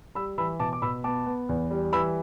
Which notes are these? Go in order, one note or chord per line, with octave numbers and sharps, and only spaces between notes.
G3 B5 E6
E3 B5 E6
B2 A5 D6
D6
B2 B5 E6
B3 A5 D6
B3
E2
G3
E3 B5 E6